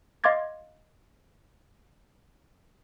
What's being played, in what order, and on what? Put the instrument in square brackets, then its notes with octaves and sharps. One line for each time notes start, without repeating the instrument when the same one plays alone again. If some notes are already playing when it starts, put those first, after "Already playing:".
[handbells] D#5 F5 C6 D6 G#6 A6